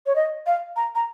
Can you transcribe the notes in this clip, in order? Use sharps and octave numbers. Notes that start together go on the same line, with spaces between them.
C#5
D#5
F5
A#5
A#5